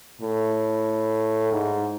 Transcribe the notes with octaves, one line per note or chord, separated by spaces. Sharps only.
A2
G#2